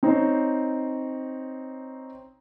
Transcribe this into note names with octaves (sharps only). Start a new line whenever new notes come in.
C4 D#4 C5 C#5